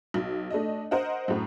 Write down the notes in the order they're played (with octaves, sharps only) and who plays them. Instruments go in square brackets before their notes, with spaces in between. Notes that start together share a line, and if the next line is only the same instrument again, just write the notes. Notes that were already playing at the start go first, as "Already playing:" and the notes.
[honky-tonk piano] B1
A3 D4 D#5
A#4 C5 D#5 F#5
F#2 A2